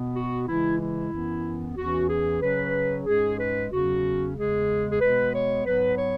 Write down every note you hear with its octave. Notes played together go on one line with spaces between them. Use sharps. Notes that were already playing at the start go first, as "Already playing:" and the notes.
Already playing: B2 B3
F#4
C#3 E3 G#3 E4
E4
F#2 E3 B3
E2 E3 C#4 F#4
G#4
C#3 F#3 C#4 B4
G#2 G#3 C#4 G#4
B4
E2 C#3 F#3 C#4 F#4
E2 C#3 G#3 G#4
G#4
B2 G#3 B3 B4
C#5
G#2 F#3 B3 B4
C#5